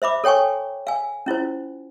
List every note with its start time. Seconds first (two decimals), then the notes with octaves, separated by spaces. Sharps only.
0.02 C5 E5 B5 D6
0.24 A4 C#5 G5 G#5 C#6
0.87 F5 G#5
1.26 C#4 E4 F4 C5